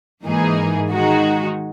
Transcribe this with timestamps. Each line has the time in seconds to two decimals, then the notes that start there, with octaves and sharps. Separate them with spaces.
0.23 G#2 E3 A#3 D#4 G#4
0.91 D#3 G#3 D#4 F#4